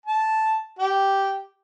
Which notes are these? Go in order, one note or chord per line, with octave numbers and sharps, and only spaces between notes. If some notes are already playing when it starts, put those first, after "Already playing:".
A5
G4